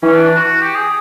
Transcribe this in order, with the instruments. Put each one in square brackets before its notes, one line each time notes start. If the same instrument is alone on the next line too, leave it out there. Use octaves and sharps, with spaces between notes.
[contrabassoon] E3 [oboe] C#4
[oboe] D4
D4
F#4
F#4
G4
G#4